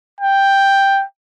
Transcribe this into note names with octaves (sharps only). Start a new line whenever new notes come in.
G5